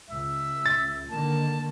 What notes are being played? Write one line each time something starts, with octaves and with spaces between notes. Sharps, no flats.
C#2 E5
A6
D3 D#3 A#3 A5